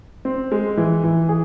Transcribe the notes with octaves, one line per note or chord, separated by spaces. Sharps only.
C4
G#3
E3
E3
G#4